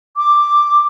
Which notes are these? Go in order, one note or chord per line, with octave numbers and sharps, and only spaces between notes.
D6